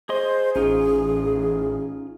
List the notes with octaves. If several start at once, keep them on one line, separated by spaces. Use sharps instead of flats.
G#4 C5 D#5 C6
A1 C#4 D#4 F4 G#4